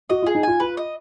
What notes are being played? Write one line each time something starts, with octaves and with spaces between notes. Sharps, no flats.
F#4 D#5
F4
G#4
D#4
F4 G#5
F4 B4
D#5